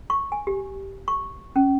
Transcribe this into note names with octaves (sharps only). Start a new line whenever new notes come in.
C#6
G#5
G4
C#6
C#4